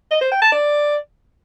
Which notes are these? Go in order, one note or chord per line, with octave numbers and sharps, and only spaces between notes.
D#5
C5
G5
A5
D5